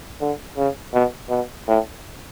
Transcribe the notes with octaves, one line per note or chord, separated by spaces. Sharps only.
D3
C#3
B2
B2
A2